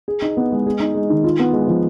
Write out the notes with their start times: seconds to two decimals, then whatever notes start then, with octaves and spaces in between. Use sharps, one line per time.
0.08 G#4
0.22 D#4
0.37 B3
0.52 G#3
0.66 G#4
0.80 D#4
0.95 G#3
1.10 D#3
1.24 F4
1.39 B3
1.53 G#3
1.68 F3